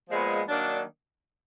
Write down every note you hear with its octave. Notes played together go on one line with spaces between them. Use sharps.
A#2 F3 G#3 B3
D#3 F#3 A#3 D4